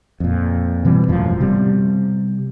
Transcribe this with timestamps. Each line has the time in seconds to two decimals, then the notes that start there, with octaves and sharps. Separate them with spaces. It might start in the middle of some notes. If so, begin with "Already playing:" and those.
0.20 F2 A#2
0.85 B2 E3 G3 C4
1.08 E1 F#2 A2 F3
1.41 C3 G3 B3